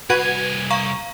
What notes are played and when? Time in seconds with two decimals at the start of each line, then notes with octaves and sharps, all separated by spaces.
0.10 C2 F#4 B4 F#5 G#5 G#6
0.70 F5 A#5 C#6